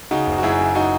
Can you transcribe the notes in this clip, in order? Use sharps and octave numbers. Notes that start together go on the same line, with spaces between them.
C#3 D#4 F#4
F#1
F#4
F#2 E4 G#4
C#3
D#4 F#4